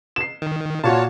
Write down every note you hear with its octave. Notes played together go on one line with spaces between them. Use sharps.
C7 E7
D#3
A#2 F4 F#4 C#5 A5